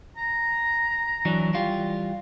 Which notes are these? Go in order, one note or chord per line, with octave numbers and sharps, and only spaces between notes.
A#5
E3 F#3 D4
E3 G3 F4